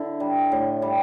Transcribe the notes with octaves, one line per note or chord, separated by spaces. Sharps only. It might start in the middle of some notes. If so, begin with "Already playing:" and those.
Already playing: D3 E4
G3
A2
G3